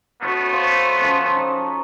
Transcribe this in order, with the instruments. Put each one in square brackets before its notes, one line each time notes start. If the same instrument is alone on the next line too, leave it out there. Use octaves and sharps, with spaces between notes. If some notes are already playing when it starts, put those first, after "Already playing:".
[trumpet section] A3 B3 [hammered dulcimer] F#4 C#5 D#5
[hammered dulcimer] C5 F5 C#6
F3 C#4 A4
D#4 A5 A#5